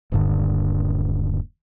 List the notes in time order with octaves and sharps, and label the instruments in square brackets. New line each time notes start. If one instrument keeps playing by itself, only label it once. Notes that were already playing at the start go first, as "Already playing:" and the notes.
[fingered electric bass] D#1 G2 D3